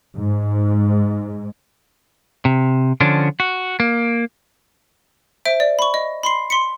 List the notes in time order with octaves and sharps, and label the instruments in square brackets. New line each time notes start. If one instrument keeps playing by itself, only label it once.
[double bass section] G#2
[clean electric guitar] C3
D3 F3 C#4 D4
F#4
A#3
[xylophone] C5 E5 D7
D5
B5 C#6
D#5
B5 C6 C7
C6 B6 C#7